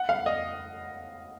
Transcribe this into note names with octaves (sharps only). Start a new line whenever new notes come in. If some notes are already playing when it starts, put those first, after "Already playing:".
Already playing: F#5
F5
D#5